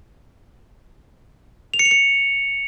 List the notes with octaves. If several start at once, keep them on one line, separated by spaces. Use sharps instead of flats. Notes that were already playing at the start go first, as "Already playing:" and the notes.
F7
C#7
F7
C#7